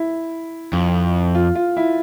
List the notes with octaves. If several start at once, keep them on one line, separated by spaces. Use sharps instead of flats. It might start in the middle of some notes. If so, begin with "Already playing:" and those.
Already playing: E4
F2
F4
F4
E4